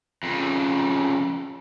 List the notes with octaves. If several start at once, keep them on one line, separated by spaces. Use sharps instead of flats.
F2 C#3